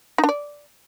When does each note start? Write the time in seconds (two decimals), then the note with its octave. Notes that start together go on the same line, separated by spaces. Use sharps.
0.18 D#4
0.24 D4
0.29 D5